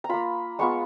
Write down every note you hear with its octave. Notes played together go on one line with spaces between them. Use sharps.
A#5
A#3 F4 B5
G#3 B3 F4 C#6